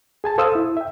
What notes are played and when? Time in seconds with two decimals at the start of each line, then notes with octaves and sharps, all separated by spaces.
0.24 G#4 G#5 A5
0.38 A4 C5 F5 D#6 E6
0.55 E4
0.77 E5 G5